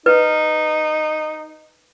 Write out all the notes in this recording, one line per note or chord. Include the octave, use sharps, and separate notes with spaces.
D#4 B4